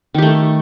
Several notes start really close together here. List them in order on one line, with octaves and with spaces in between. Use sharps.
D#3 G4 A3